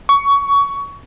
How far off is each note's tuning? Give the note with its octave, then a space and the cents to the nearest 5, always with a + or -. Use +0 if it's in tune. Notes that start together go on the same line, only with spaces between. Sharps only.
C#6 +20